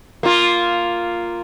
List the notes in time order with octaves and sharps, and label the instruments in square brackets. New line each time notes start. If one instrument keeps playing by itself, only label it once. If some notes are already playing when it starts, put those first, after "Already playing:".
[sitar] A#3 F4